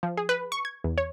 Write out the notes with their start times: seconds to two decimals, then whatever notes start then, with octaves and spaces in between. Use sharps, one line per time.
0.03 F3
0.17 G#4
0.29 B4
0.52 C#6
0.65 G#6
0.84 E2
0.98 C#5